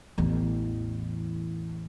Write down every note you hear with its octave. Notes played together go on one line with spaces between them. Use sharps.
A1 E2